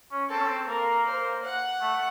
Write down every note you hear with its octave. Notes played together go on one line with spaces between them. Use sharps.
C#4
C4 A4
C#4
C4
A#3 A#4
C5
F#5
A3